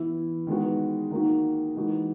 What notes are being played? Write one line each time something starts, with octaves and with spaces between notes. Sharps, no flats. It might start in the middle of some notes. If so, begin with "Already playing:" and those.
Already playing: E3 B3 E4
D#3 G#3 B3 D#4 F#4
D#3 A#3 D#4 F#4
E3 G#3 D#4 F#4